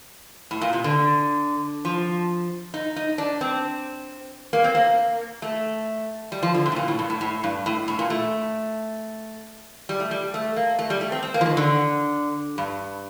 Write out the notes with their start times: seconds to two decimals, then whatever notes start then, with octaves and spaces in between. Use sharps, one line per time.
0.51 A2
0.61 A#2
0.73 C3
0.84 D3
1.85 F3
2.74 D#4
2.96 D#4
3.18 D4
3.41 C4
4.53 A#3
4.64 C4
4.75 A#3
5.42 A3
6.32 G3
6.43 F3
6.54 D3
6.66 C3
6.72 A2
6.76 A#2
6.88 A2
6.99 G2
7.10 A2
7.21 A2
7.44 G2
7.66 A2
7.88 A2
7.99 A#2
8.10 A3
9.89 G3
10.00 A3
10.11 G3
10.34 A3
10.56 A#3
10.79 A3
10.90 G3
11.01 A3
11.12 C4
11.23 C4
11.34 A#3
11.41 F3
11.46 D#3
11.57 D3
12.58 G2